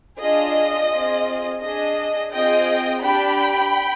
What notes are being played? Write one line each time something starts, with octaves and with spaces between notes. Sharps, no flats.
D4 F4 G#4 D#5
C4 F4 G#4
D4 G#4 D#5
C4 F4 G#4 D#5 G5
D4 G4 G5 B5